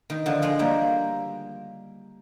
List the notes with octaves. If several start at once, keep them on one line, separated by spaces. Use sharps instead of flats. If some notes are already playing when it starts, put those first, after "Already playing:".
D#3
D3 F3
F3 G#3
G3 A#3